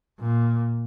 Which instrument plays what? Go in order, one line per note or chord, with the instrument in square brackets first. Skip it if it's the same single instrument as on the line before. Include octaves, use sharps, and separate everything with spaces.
[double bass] A#2